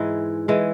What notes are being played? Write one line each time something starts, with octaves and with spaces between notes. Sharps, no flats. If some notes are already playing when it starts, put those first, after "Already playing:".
Already playing: G#2 E3 G#3
E3 G#3